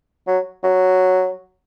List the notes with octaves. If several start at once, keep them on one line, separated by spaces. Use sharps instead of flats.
F#3
F#3